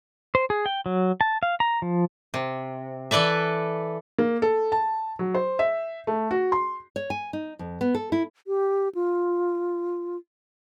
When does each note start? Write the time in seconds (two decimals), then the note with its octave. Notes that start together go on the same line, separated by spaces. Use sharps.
0.35 C5
0.50 G#4
0.66 G5
0.86 F#3
1.21 A5
1.43 F5
1.60 A#5
1.82 F3
2.34 C3
3.11 E3 A4 B4 D5 E5
4.18 A#3
4.42 A4
4.72 A5
5.19 F#3
5.34 C5
5.59 E5
6.07 A3
6.31 F#4
6.52 C6
6.96 C#5
7.10 G#5
7.33 D#4
7.59 F2
7.81 B3
7.95 A4
8.12 E4
8.47 G4
8.95 F4